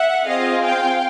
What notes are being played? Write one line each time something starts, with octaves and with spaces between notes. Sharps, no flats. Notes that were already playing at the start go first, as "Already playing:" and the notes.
Already playing: E5 F#5
C4 F4 G#4 D#5 F5
F5 G5